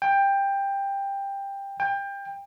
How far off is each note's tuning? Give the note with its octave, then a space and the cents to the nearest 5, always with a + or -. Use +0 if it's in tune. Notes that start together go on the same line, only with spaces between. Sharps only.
G5 +15
G5 +25